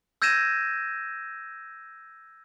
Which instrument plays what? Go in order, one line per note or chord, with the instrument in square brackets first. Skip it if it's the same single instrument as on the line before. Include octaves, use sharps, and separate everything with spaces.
[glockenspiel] E6 G6 G#6 A#6 D#7 E7